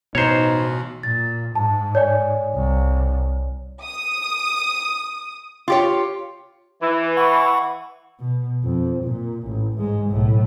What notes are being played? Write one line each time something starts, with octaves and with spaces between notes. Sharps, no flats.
A1 B2 D#4 C5 C#5 A#5 C6
A#2 A6
G#2 A5
C#5 D5 G#5
C2
D#6
F4 G4 C#5
E3
F#5 B5 C#6
B2
F2
A#2
A1
G#2 G#3
B1 A2